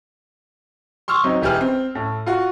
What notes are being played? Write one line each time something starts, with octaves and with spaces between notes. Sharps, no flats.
C6 C#6 E6 F6
F#3 C4 D#4
E1 E4 G4 G#4 B4 F6
C4
A2
F4 F#4